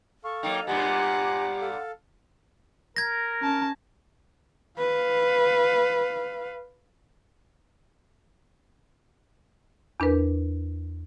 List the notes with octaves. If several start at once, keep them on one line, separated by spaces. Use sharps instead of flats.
A4 F5 C#6
F#3 A#3 D#4 G5
G2 A#2 B3 G4 F#5 G#5 A#5 D6
A4 F5
A#4 G#6 A#6
C#4 A5
B4 F5
E2 D4 A#4 B4